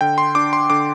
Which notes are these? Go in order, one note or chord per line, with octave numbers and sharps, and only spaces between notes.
D3 G5
C6
D4 D6
C6
D3 D6